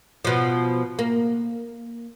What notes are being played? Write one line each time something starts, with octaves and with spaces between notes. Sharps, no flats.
B2 F3
A#3